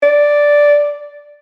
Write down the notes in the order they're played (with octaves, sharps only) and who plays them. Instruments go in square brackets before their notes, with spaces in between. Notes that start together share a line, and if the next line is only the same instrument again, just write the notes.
[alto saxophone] D5